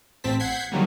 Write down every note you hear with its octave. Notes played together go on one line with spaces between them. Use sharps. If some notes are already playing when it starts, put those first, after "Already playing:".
A1 C4 A5 B6
F#5 G6 G#6 B6 C7
D3 D#3 F#3 G3 A#3